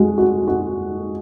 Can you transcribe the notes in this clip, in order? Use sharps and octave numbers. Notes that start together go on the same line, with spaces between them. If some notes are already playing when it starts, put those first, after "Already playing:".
Already playing: G#3 F#4
F#4
F#4